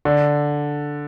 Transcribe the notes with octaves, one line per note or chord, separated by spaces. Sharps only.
D3